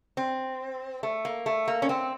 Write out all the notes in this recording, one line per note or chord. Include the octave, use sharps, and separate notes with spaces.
C4
A3
A#3
A3
A#3
C#4
C4